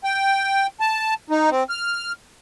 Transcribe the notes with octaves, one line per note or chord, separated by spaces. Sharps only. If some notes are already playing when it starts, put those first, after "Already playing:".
G5
A5
D#4
C4
F6